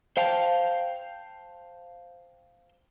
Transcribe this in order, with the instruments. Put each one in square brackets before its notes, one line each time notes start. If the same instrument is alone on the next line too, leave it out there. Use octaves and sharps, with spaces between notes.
[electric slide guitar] C5 F5 G5 A5